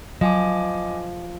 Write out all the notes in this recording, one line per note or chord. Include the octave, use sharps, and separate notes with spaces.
F3 F#3 D#5 G#5 D6